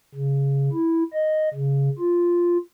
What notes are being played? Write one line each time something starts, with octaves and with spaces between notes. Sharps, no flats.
C#3
E4
D#5
C#3
F4